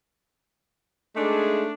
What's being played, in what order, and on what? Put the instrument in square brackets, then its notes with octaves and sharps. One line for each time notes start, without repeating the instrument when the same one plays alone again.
[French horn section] G#3 D#4 G#4 [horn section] A3 D4